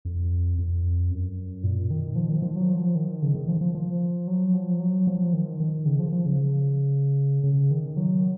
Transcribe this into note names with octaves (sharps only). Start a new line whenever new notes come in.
F2
F2
F#2
A#2
D#3
F3
D#3
F3
F#3
F3
D#3
C#3
D#3
F3
F3
F3
F#3
F3
F#3
F3
D#3
D#3
C#3
F3
F3
C#3
C#3
D#3
F#3